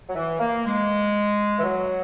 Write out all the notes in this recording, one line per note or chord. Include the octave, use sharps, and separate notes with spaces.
F#3
E3
A#3
G#3
E3
F#3